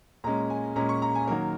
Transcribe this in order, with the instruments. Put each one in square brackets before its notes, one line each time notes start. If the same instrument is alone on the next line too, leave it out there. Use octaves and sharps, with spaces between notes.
[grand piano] A#2 G#3 C#4 A#5
G#5
A#2 G#3 C#4 A#5
C#6
A#5
G#5
D#3 F#3 A#3 A#4